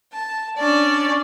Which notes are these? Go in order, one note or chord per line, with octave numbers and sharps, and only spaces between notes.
A5
C#4 D4 D5